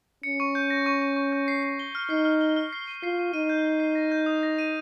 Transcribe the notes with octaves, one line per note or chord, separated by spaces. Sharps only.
C#4 C#7
C#6
G6
A#6
C#6
C#6
C#6
G6
C7
C7
G7
F6
D#4 C7
F6
G7
F6
C7
D#7
F4 C7
D#7
D#4 D#7
G6
G6
C7
A#6
G6
D#6
A#6
D#7